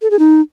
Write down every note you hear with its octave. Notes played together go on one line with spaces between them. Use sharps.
A4
G#4
D#4